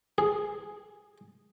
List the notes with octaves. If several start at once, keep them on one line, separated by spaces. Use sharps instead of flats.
G#4